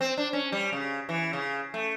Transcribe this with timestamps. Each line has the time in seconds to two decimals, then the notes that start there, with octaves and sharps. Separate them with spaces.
0.01 C4
0.18 D4
0.33 C#4
0.52 G3
0.73 C#3
1.09 E3
1.33 C#3
1.74 A3